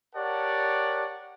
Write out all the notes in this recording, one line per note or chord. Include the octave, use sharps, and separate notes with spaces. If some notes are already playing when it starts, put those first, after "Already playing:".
G4 A#4 C#5 D5 F#5 A5